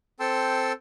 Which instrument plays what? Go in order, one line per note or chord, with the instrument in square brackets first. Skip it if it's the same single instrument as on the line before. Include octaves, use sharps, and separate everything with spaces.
[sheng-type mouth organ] C4 A4 G5 A5 C6 E6